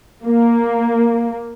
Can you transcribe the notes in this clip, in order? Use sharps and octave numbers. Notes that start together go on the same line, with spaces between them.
A#3